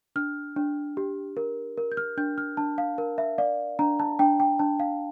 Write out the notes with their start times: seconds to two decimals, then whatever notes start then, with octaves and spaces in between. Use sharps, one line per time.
0.16 D4 F6
0.56 D4
0.97 G4
1.37 A#4
1.77 A#4
1.92 G6
1.97 F6
2.17 D4 G6
2.38 F6
2.57 D4 A5
2.78 F5
2.98 A#4
3.18 E5
3.38 D5 F5
3.79 D4 A#5
3.99 A5
4.19 D4 G5
4.40 G5
4.59 D4 A5
4.80 F5